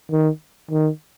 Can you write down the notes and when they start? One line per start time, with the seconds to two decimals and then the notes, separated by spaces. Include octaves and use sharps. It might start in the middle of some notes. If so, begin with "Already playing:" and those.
0.11 D#3
0.71 D#3